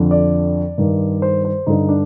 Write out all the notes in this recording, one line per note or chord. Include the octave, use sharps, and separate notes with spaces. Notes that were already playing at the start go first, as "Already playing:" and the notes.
Already playing: F2 D3
D5
G2 D#3
C5
C5
G2 D3 D#4
D4